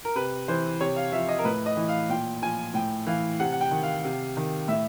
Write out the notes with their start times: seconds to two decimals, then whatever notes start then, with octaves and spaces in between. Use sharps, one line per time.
0.05 A#4
0.15 C3 B4
0.48 E3 C5
0.80 C3 C#5
0.96 F5
1.12 F3 E5
1.29 D#5
1.39 A#4
1.45 A2 B4
1.66 D#5
1.77 E3
1.88 F5
2.09 A#2 G5
2.42 F3 G#5
2.74 A2 G5
3.07 E3 F5
3.40 C3 F#5
3.53 F#5
3.61 G5
3.71 D#3
3.83 F5
4.04 C3
4.37 D#3
4.68 A2 E5